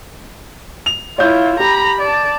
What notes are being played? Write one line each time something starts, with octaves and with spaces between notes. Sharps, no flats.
F7
E4 F4 C#5 F5 G6
G4 A#5 B5
D5 A5